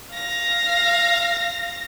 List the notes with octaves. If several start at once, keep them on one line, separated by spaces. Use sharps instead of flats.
F5 A#6